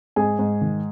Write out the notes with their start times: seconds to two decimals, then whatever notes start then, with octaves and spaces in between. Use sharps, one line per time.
0.16 G#2 G#4 G#5
0.39 G#2
0.61 D#3